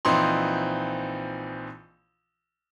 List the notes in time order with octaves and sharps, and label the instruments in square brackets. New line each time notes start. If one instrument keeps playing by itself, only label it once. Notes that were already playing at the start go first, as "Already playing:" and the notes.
[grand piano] A#1 E3 F3 C4 D#4 C6